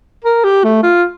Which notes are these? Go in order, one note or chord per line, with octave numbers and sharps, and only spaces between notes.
A#4
G4
A3
F4